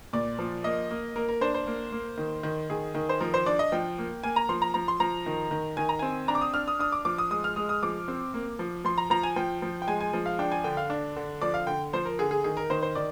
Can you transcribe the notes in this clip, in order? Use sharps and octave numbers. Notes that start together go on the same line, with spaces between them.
A#2 D5
F3
A#3 D#5
A#3
A#3 A#4
A#4
D4 C5
C5
A#3
A#3
D#3
D#3
D#3 G#4
D#3
C5
F3 A#4
C5
D4 D5
D#5
F3 G5
A#3
A#3 G#5
A#5
F3 C6
A#5
F3 A#5
C6
F3 A#5
D#3
D#3
D#3 G#5
A#5
C4 G#5
D4 A#5
D6
D#6
D4 F6
D#6
D4 D#6
D6
F3 D6
D#6
G#3 D#6
F6
G#3 D#6
D#6
F3 D6
C4
A#3
F3
F3 C6
A#5
F3 A#5
G#5
F3 G5
F3
G5
G#3 G#5
G#5
F3
F5
D4 G5
G#5
D3 G5
F5
D4
D3
F3 D5
F5
D3 G5
F3 C5
A#4
D3 G#4
G#4
D#3 G#4
A#4
D#3 C5
C5
D#3 D5